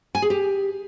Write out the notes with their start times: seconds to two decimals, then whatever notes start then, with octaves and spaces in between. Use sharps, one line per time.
0.15 G#5
0.22 G#4
0.30 G4